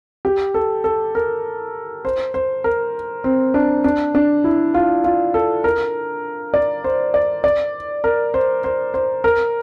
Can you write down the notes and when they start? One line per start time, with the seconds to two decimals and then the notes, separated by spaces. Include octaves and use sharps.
0.25 G4
0.54 A4
0.84 A4
1.15 A#4
2.05 C5
2.34 C5
2.64 A#4
3.24 C4
3.54 D4
3.84 D4
4.15 D4
4.44 E4
4.74 F4
5.04 F4
5.34 A4
5.64 A#4
6.54 D5
6.84 C5
7.14 D5
7.44 D5
8.04 A#4
8.34 C5
8.64 C5
8.94 C5
9.24 A#4